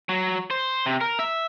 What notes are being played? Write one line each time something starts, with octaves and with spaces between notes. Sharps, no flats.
F#3
C5
C3
A#4
E5